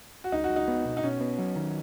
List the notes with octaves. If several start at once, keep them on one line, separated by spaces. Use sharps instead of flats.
F#4
C#2 D#4
F#4
C#2
D#4
B3
B2
D#4
B2 C#4
B3
F#3
D#3